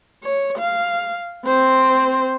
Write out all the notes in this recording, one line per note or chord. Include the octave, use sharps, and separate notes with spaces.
C#5
F5
C4 C5